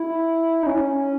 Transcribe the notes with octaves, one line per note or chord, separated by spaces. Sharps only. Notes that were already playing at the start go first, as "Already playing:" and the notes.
Already playing: E4
D#4
C#4
C#4